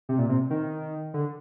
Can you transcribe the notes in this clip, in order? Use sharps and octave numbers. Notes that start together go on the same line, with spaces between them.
C3
A#2
C3
D#3
D3